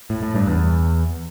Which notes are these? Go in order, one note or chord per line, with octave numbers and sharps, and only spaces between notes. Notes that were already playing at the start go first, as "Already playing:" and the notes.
A2
A2
G2
E2